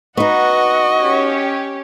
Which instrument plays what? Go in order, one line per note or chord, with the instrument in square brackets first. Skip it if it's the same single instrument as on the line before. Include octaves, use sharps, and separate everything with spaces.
[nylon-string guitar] B3 D#4 [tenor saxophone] F#4 [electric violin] D#5 [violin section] F#5
[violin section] C#4 G4 C#5